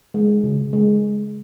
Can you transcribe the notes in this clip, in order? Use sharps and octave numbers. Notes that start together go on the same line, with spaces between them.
G#3
C#3
G#3